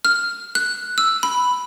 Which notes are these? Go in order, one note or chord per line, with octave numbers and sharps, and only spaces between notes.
F6
F#6
E6
B5